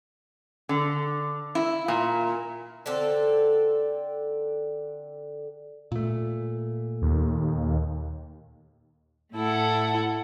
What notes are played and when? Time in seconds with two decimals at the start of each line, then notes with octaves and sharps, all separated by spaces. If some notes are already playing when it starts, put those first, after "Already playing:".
0.69 D3
1.55 E4
1.88 A#2
2.86 D3 C4 A4
5.92 A#2 A3
7.02 D#2
9.35 A2 E4 A4 F#5